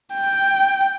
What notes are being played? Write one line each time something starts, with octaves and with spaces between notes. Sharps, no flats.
G5